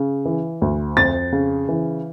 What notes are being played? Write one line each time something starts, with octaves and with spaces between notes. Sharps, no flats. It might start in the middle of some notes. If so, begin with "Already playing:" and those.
Already playing: C#3
E3
D2
F2 A6
C#3
E3